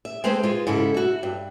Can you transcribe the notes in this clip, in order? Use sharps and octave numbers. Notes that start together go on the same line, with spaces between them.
E5
G#3 C4 G#4 A4 B4 C5
G#3 F4
G#2 C#3 E4 A4
F#4 E5
G2